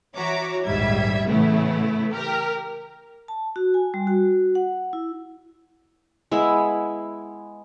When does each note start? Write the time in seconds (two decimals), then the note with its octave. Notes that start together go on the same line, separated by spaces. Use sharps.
0.15 E3 F#4 C#5 E5 A#5 D6
0.64 A#1 D#2 G#2 G3 E5 G#6
1.26 A2 C#3 E3 A3 B3 E4
2.11 G4 A#4 F6
3.28 A5
3.56 F#4
3.74 G#5
3.94 G3
4.07 F#4
4.55 F#5
4.93 E4
6.31 G#3 B3 E4 E5